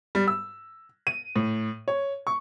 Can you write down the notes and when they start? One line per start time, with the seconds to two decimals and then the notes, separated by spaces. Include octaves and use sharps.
0.15 G3
0.28 E6
1.07 D#7
1.36 A2
1.88 C#5
2.27 C#6